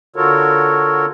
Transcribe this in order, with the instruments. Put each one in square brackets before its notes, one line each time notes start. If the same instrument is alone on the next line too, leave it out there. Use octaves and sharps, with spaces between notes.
[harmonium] D3 F4 F#4 A4 A#4 C#5